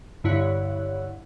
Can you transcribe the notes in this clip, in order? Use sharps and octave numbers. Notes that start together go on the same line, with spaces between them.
G2 D3 E4 C#5 F#5 F#6